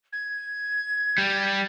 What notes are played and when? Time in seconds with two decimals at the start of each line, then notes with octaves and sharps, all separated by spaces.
0.13 G#6
1.18 G3